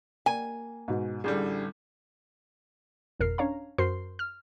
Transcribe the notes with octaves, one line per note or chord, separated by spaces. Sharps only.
A#3 G#5
G#2 B2
A1 D3 G3 G#4 G6
G1 F2 B2 A#4 F6 C7
C#4 D4 C#5 F5 A#5
F#2 F#4 A#4 C5 C6 C7
F6